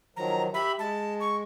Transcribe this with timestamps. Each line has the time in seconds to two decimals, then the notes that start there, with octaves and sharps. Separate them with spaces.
0.17 D#3 F3 F#3 A#5
0.54 G4 E5 B5
0.79 G#3 A5
1.20 C#6